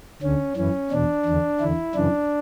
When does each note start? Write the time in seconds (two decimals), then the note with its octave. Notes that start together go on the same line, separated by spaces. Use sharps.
0.22 D2 D3 C#4
0.57 F#2 E3 C#4
0.91 E2 B2 D4
1.25 E2 D3
1.60 E2 D3 E4
1.95 F#2 C#3 E3 D4